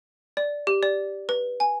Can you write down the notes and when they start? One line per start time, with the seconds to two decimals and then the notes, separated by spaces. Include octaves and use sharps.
0.37 D5
0.67 G4
0.83 D5
1.29 B4
1.60 G#5